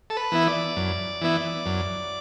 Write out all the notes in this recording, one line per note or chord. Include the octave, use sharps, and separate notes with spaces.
A4
B4
E3 B3 E4
D5
F#2
E3 B3 E4
F#2